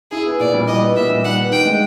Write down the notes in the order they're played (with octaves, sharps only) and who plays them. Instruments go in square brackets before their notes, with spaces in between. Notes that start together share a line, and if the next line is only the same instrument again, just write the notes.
[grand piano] E4 [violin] G#4
[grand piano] B3
[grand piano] A#2 [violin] D5
[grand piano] G3
[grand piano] E4 [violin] D#5
[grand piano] B3
[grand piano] A#2 [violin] E5
[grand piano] G3
[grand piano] D#3 [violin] F#5
[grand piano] B3
[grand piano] D#3 [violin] G5
[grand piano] G#3